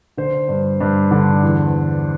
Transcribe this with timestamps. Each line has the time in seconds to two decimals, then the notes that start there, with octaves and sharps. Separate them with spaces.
0.17 D3 C5
0.49 G2
0.81 G2
1.11 D3
1.43 E2